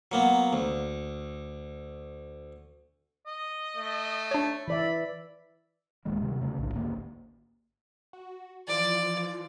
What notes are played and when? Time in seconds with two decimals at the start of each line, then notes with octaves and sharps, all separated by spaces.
0.12 F#3 A#3 B3
0.53 D2
3.26 D#5
3.76 A3
4.31 D4 C#5
4.68 E3 D5 E5 B5
6.05 D1 D#3 G#3 A#3
6.22 C3 D#3 G3
6.40 E2 C#3 A3
6.59 B1 A2 D3
6.71 G#1 D2 A#3
8.13 F#4
8.68 E3 F3 F4 D5